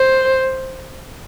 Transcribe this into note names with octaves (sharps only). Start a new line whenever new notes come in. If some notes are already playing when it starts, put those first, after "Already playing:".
Already playing: C5